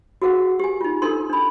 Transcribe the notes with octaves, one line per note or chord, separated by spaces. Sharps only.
F#4 G#4 A#4 F5 F#5
G4 G#5
D#4 F4
D4 D#4 A4 A#4 C6
D4 B5